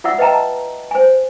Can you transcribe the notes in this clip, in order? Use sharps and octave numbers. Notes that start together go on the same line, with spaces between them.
F4 D5 E5 F#5 E6
B4 D#5 E5 G5 A5 A#5
C5 G#5